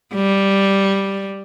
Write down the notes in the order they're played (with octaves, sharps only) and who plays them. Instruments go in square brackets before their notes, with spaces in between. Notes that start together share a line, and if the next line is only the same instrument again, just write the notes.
[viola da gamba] G3